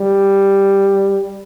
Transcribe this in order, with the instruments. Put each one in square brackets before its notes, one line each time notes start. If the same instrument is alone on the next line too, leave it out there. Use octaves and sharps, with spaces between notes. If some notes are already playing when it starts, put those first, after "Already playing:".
Already playing: [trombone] G3